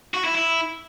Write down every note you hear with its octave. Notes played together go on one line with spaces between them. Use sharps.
F#4
E4
E4